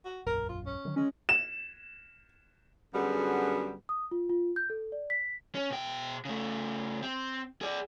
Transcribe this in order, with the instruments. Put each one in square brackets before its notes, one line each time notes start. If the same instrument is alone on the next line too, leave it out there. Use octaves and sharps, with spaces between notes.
[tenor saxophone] F#4
[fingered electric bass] E1 A#1 F#2 [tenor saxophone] A#4
[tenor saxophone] F4
C#4
[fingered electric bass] D3 D#3 F#3
[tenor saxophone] G#3 [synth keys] C#4
[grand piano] E7
[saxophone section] F#2 D3 G3 B3 F#4 G#4
[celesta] D#6
F4
F4
G6
A4
D5
B6
[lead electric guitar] C#4
B2 G5
C#3 A3
C4
G#4 D5